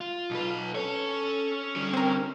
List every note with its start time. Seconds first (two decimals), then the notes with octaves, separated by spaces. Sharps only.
0.01 F4
0.31 B1 B4
0.75 C#4 A4 C#5
1.76 D3 G3
1.93 C4 A#4